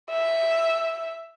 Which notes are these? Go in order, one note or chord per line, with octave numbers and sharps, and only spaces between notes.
E5